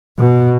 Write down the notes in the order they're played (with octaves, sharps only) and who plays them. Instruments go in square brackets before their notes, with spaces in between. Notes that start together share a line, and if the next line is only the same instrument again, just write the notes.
[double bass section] B2